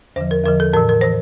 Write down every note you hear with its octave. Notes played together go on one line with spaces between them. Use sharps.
E2 D3 F3 C5
A#4
E2 D3 F3 A#4
A4
A2 E3 A#4
A#4
A2 E3 C5